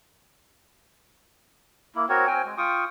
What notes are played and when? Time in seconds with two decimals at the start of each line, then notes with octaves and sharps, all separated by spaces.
1.95 A#3 E4
2.09 C4 F#4 A#4 C#5
2.27 C4 G5 G#5
2.45 G#3
2.58 F4 G5 C#6 D#6